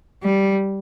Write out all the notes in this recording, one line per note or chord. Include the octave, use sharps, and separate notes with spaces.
G3